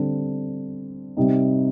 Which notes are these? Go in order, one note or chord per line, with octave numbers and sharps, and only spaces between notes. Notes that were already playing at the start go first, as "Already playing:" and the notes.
Already playing: D3 G3 C4
C3 G3 C4 D#4